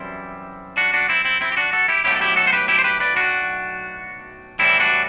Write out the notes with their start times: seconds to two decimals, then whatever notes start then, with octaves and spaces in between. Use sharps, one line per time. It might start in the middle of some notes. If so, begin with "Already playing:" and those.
Already playing: F#2 E3 G3 C4 E4
0.77 D4 F#4
0.94 D4 F#4
1.09 C4 E4
1.25 C4 E4
1.41 C4 E4
1.52 G4
1.57 D4 F#4
1.73 F#4 A4
1.88 E4 G4
2.04 B1 A2 F#3 A3 E4 G4
2.16 A4
2.21 E4 G4
2.36 F#4 A4
2.47 C5
2.53 G4 B4
2.68 E4 G4
2.79 C5
2.84 G4 B4
3.00 B4 D5
3.16 D4 F#4
4.59 A2 E3 G3 C4 E4
4.80 D4 F#4